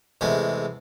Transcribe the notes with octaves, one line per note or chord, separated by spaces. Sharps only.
E2 C3 G#3 A3 G#5